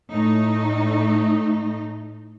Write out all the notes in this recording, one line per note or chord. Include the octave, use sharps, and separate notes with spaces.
A2 A3 D#4